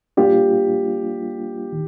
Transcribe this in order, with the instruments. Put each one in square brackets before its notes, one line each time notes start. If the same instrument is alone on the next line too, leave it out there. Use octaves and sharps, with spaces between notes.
[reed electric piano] G3 A#3 D4 F4 [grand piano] G4
[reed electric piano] D#3